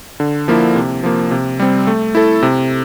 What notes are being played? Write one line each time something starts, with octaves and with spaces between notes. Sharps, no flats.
D3
F3 A#3 E4
C3
F3 A#3
C3
G3 C4
A3
E4 A4
C3